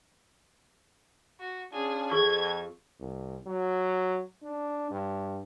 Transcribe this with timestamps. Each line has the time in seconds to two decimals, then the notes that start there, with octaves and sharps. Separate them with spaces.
1.40 F#4
1.73 C#4 D4 F4 G#4
2.11 F2 G#4 C#6 G#6
3.00 C2
3.46 F#3
4.43 D4
4.91 G2